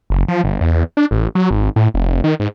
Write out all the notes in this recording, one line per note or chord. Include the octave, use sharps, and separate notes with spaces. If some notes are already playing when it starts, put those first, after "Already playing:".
F#1
F3
G1
E2
D4
A1
F#3
G#1
A2
F1
D#3
G#2